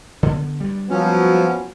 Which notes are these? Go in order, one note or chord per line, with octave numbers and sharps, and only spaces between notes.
D3 B3
G2 G3
F3 F#3 A#3 B3 C#4 F#4